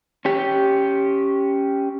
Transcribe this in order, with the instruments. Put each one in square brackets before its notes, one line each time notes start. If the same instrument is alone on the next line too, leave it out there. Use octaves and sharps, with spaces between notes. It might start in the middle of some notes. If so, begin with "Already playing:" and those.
[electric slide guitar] C#4 G4